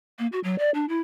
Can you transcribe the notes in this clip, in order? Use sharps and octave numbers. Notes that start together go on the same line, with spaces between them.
A#3
F#4
F#3
D5
D4
E4